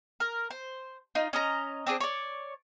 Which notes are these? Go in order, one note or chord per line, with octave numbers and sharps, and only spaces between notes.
A#4
C5
D#4 F4
C#4 D#5 A#5
C4 D4 G#4 C5
C#5 D5